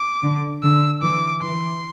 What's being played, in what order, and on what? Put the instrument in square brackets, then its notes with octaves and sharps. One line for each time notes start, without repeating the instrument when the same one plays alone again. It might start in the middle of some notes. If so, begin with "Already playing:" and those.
Already playing: [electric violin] D6
[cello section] D3
[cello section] D3 [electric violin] E6
[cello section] E3 [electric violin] D6
[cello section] E3 [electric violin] C6